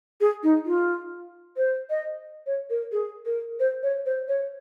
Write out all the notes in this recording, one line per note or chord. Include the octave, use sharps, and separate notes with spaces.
G#4
D#4
F4
C5
D#5
C#5
A#4
G#4
A#4
C5
C#5
C5
C#5